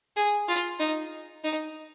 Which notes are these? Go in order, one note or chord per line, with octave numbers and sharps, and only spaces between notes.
G#4
F4
D#4
D#4